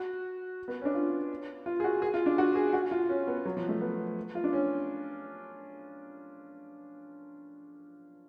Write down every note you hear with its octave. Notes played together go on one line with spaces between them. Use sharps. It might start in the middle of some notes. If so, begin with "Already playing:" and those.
Already playing: F#4
B3
C#4
D4
F4
F4
G#4
F#4
G#4
F4
D4
F#4
G#4
F#4
F4
C#4
B3
F#3
F3
A3
B3
F4
D4
C#4